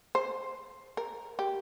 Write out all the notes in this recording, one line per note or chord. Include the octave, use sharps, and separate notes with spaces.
C5
A#4
G4